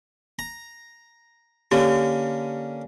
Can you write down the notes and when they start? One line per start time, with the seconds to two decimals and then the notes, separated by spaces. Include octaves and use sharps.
0.39 A#5
1.71 D3 A#3 C#4 G4